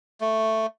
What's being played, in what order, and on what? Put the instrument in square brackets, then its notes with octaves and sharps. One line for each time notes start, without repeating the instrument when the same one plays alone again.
[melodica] A3